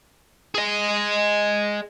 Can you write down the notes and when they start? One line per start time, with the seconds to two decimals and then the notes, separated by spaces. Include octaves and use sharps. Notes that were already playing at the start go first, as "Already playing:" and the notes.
0.55 G#4 D#5